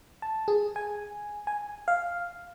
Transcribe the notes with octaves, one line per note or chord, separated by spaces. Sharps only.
A5
G#4
G#5
G#5
F5